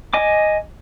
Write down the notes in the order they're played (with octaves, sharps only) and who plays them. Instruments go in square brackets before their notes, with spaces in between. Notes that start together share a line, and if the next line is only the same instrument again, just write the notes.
[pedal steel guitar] D#5 G#5 D6